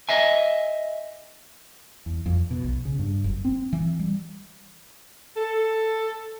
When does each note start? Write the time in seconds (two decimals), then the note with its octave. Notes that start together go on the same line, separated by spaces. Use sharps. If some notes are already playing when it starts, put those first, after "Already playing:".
0.09 D#5 E5 G#5
2.06 E2
2.26 F2
2.51 B2
2.64 B1
2.85 C#3
2.99 G2
3.24 F#1
3.45 C4
3.73 E3
3.99 G3
5.34 A4